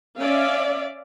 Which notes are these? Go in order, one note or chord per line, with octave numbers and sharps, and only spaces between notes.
C#4 D5 E5 F5